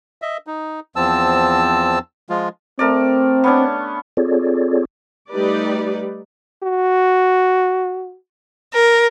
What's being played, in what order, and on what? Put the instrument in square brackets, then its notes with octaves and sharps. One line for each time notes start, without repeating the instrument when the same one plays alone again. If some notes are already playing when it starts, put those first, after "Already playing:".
[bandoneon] D#5 E5
D#4
E2 F3 C4 A5 E6
F3 G#3 F4
[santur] A3 A#4 D5 [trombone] C4
[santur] B3 C#4 D4
[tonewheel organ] C4 F4 G#4 A4 C#5 D5
[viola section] G3 A3 D#4 G4 B4 D5
[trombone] F#4
[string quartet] A#4